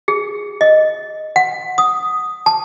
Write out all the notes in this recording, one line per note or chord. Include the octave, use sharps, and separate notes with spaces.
G#4
D#5
F#5
D#6
A5